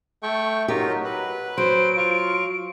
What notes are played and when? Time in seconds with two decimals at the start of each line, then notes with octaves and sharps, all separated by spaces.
0.23 A3 G5 C#6
0.68 F#3 D#4 F4 G4 A#4
1.04 B4
1.58 F#3 C5 D7
1.97 F4 F5 C#6